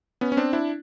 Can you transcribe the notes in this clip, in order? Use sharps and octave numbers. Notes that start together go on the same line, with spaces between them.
B3 C#4
C#4
C4 D4
D4 E4